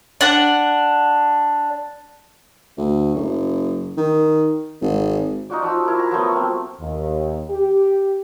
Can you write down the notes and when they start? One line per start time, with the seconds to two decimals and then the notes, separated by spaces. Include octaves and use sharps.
0.21 D4 F#5
2.78 D2
3.15 F#1
3.98 D#3
4.82 G#1
5.50 D#4 F4 F#4 D5
5.62 F3 F#4 E6
5.85 E4 A#4
5.99 A#5
6.11 F3 F#3 A3 B3
6.32 A#3 C4
6.80 D#2
7.50 G4